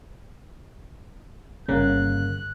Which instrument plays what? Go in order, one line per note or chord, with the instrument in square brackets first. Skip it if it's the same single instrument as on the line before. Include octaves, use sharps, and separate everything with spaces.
[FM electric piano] G1 C#3 A#3 [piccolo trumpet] F#6